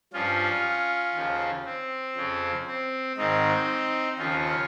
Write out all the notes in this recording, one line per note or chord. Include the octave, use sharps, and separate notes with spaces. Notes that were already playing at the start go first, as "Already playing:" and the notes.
G2 F3 C#4 F4
D#2 C#3 F3
C4
F2 C#3 F3
C4
G#2 D#3 C4 D#4
D#2 C#3 F3 C#4 F4